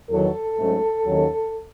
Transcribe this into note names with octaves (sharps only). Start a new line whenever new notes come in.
E2 D#3 F#3 A4
G#2 F#3 A3 C#4
D#2 D#3 F#3 C#4